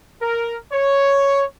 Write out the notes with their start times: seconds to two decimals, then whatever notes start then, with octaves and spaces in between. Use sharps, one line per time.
0.21 A#4
0.71 C#5